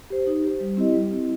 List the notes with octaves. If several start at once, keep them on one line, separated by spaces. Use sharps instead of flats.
G4 C5
D#4
G4 C5
G3
C4 E4 G4 D#5
G3
C4 E4 G4 D#5